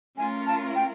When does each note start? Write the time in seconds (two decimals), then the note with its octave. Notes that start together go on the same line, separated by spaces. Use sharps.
0.17 A3 C#4 F4 A#4 G#5
0.47 A5
0.75 G5